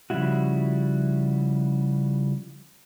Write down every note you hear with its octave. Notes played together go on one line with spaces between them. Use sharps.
C#3 F3 G3 E4 F#4